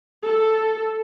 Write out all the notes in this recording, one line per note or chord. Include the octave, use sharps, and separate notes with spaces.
A4